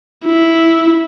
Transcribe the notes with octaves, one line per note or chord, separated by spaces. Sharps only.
E4